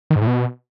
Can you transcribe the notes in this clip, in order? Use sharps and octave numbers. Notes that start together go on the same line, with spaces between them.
D#3
G#2
A2
B2